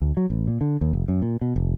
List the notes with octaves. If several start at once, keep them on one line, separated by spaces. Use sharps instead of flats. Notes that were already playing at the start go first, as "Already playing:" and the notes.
D2
F#3
A1
A#2
D3
D#2
F1
F#2
A#2
B2
F1